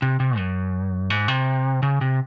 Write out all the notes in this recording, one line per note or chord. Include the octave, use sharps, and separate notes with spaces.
C3
C3
F#2
G#2
C3
C#3
C3